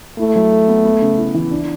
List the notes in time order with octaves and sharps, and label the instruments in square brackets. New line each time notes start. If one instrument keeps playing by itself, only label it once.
[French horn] A3 [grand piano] E4
[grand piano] F#3
A4
B3
B3
C#3
E4
E3
D4